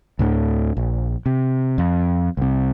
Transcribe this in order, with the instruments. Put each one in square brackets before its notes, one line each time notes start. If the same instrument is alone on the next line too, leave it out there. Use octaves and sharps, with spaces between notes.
[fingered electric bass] D2 A2 D3
A#1
C3
F2
C2 C3